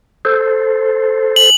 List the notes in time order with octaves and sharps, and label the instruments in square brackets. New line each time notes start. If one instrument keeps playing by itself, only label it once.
[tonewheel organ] A4 C5
[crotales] F#7